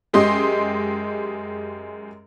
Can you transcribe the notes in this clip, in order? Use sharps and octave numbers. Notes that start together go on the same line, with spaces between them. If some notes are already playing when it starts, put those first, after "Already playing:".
F#2 G#3 G4 D#5 C6